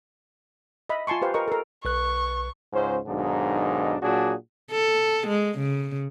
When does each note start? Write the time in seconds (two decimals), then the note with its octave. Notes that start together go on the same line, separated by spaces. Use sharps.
0.89 D#5 E5 B5
1.07 F4 G#5 A5 C6 C#6
1.22 G4 B4 C5 F5
1.34 A#4 D#5 C#6
1.48 A4 A#4
1.85 B1 B4 C#6 F#6
2.73 C#2 G#2 C#4 C5
3.06 B1 G#2 D#3 D4 D#4
4.02 A#2 F#3 D4 F#4 G#4
4.72 A4
5.27 G#3
5.58 C#3